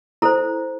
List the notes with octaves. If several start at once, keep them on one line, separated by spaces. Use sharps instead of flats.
E4 A4 C5 A#5